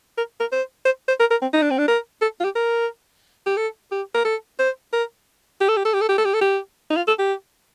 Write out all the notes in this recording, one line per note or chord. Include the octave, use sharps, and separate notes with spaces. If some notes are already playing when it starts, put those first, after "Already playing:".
A#4
A#4
C5
C5
C5
A#4
A#4
C4
D#4
D4
C4
D4
A#4
A4
F4
G4
A#4
G4
A4
G4
A#4
A4
C5
A#4
G4
A4
G4
A4
G4
A4
G4
A4
G4
A4
G4
D#4
F4
A4
G4